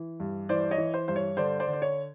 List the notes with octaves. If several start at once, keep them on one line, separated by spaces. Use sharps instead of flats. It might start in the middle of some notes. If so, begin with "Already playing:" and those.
Already playing: E3
G2
E3 C5 D5
C#5 D#5
E3
C5
G2 C5
C#5
D3 C5 D5
C5 D5
D3
D5
C#5